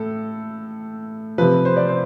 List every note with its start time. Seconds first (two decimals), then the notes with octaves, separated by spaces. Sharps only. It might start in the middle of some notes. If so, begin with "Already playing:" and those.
Already playing: A2 A4
1.38 C3 F3 B4
1.65 C5
1.77 D5
1.89 C5